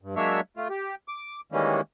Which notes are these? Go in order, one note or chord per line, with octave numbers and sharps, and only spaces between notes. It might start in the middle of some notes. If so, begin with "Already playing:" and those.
G2
F#3 G#3 A#3 D4 C#5 E5
A3 F4
G4
D6
D#3 E3 G3 G#3 A#3 C#4